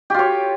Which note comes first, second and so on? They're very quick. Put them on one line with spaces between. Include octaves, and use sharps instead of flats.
G4 F4 C#5